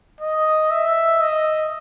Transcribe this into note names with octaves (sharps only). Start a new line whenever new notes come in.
D#5
E5
D#5